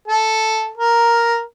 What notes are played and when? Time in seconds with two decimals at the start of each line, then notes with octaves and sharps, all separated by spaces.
0.08 A4
0.77 A#4